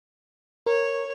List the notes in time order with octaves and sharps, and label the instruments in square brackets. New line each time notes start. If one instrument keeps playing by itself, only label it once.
[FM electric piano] A#4 [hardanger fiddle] C#5